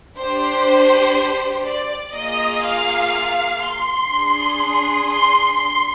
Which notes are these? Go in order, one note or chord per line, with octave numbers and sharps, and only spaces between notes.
D4 G4 C5
D5
A#3 F4 G#4 D#5
F5
C6
D4 G#4
C6
C6